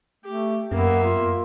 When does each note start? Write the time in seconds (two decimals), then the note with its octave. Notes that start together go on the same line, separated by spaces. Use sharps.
0.25 A3 G4
0.72 F#2 A#3 B3 E5
1.04 F4